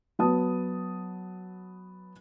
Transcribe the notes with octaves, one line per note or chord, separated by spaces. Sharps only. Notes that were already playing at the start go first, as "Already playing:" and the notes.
F#3 B3 A5 D#6